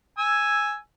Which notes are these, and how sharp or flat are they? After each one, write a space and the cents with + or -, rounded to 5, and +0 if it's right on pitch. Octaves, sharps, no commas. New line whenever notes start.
G#5 +0 E6 +0